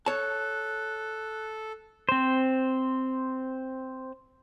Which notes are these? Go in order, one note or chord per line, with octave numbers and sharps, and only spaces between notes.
A4 C#5 A5 F#6
C4 C5